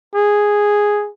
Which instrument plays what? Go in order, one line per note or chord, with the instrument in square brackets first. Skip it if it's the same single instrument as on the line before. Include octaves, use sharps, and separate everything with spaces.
[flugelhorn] G#4